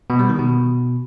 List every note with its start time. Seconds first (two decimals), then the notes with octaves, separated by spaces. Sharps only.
0.10 B2
0.19 G3
0.29 D#3
0.39 B2